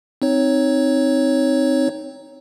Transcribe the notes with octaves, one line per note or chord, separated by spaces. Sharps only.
C4 D#4 C#5